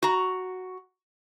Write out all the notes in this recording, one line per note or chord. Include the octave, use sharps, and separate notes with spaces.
F#4 A#5